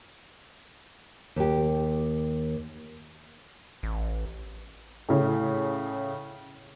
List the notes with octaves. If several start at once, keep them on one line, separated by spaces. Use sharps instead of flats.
D#2 G4
A1
A2 C#3